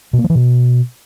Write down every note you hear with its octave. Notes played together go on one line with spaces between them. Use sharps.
B2
A#3
F3
E3
B2